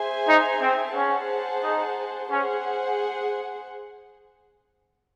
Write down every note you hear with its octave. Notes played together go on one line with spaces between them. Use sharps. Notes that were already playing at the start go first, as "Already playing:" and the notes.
Already playing: G#4 C5 E5 G#5
D#4
C4
C#4 G#4 C5 F#5 A5
D#4
C#4 G#4 C5 F#5